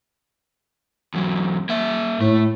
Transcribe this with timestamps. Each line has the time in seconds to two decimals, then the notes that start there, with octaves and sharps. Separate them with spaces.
1.14 E2 F#3
1.69 A#3 E5
2.21 A2 A3